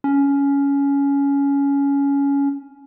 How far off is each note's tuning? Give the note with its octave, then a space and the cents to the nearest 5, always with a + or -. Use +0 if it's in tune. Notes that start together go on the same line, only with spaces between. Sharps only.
C#4 +15